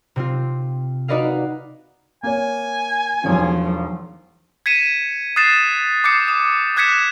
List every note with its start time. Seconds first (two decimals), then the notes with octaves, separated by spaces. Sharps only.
0.16 C3 C4 F4
1.08 D#4 F#4 B4 D5 D#5 F5
2.23 A#3 C#5 G#5
3.24 E1 B1 E2 F3
4.66 G#6 B6 C#7 D#7 E7
5.36 D#6 F#6 A6 C7 E7
6.04 D6 D#6 G6 C7 C#7
6.28 D#6
6.77 D#6 F#6 G#6 B6 C#7 E7